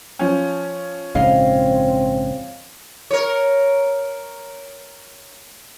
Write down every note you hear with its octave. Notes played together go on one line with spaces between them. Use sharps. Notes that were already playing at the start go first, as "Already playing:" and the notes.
F3 C#4
A#1 G#2 C#3 C4 D#5 F5
A#4 C#5